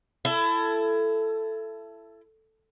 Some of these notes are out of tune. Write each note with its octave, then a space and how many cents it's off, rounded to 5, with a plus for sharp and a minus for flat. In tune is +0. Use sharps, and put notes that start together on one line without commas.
E4 +25 A4 +0